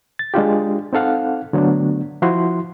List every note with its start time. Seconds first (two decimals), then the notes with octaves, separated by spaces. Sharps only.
0.19 A6
0.34 G#3 D4 F4 G4
0.93 C4 D#4 A4 F5 F#5
1.53 D3 F#3 A3 B3 D4
2.22 F3 E4 F#4 C6